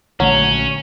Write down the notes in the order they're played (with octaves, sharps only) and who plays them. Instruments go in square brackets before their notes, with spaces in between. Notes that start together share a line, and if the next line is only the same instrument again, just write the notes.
[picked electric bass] A#1 D3 A3 [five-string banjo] F#3 [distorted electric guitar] C#4